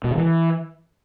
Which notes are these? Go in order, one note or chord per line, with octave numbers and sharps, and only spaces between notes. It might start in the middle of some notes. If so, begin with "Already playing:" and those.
B2
C#3
E3